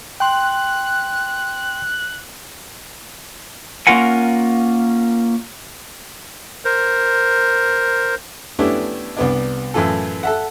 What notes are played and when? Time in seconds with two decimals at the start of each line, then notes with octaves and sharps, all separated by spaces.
0.20 G5 C6 F#6
3.87 A#3 C#4 F4 A#4 F#5 G#5
6.65 A#4 C5
8.59 A3 B3 C#4 D4 E4 G4
9.17 C2 B3 D4
9.74 F#2 A2 E3 F4 A4
10.23 A4 E5 F#5